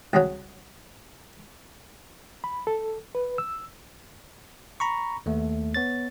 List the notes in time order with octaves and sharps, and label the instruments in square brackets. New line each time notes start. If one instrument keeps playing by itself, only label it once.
[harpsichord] C2 F#2 C#3 F#3
[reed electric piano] B5
A4
B4
E6
[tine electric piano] A#5 B5 C#6
D#2 A3
B3 C#5 A6